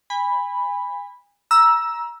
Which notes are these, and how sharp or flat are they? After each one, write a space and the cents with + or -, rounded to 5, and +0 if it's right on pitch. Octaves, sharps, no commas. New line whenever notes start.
G#5 -35 B5 +0
A#5 +25 E6 +0